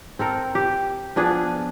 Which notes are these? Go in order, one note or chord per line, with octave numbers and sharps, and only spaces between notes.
C4 A4 A#4
G4
F3 B3 D4 G#4